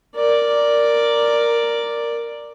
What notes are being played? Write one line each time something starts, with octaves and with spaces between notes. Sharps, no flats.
A#4 D5